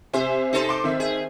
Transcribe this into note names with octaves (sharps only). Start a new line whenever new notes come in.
C3 C5 E5 G#5
D#4 A4 C5
C6 D6
D#3 C4 E5
G#4